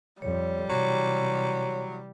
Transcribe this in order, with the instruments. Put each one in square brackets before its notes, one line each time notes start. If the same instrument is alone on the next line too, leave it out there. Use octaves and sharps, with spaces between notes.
[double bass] F2 [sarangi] G3 [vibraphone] C#5
[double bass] C3 E3 [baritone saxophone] F#3 [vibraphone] C#5